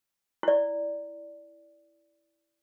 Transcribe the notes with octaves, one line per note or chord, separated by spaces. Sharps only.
E4 D5